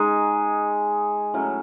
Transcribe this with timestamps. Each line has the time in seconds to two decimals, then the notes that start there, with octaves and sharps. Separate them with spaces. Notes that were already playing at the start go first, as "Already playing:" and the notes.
Already playing: G#3 D#4 G#4
1.34 A2 F#3 C#4